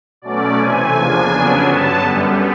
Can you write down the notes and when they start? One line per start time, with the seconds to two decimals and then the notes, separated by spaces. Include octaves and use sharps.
0.22 B2 F#3 A3 C#4 D5
0.57 C3 E3 A3 C4 G#5
0.94 E2 C#3 F3 A#3 D4
1.30 F2 C#3 F#3 B3 D4
1.65 G2 D3 F#3 B3 A5
2.02 F#2 D3 G3 B3